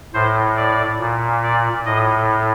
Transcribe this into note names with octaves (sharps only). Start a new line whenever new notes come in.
A2 C5
D5
A#2
D5
A2 D#5